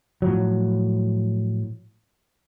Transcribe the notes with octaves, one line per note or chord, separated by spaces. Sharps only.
A2 F3 F#3